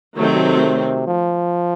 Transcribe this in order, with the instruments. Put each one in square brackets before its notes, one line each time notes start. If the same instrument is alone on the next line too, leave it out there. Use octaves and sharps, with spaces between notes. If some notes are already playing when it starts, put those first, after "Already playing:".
[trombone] C3 [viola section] D#3 F#3 A3 C4
[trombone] F3